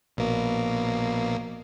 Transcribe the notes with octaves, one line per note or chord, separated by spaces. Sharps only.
A#1 B2 A#3